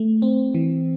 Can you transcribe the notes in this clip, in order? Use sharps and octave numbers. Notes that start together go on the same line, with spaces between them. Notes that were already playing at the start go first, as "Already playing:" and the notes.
Already playing: A3
C4
E3